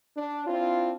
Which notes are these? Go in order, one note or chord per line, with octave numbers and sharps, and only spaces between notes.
D4
C4 D4 E4 F4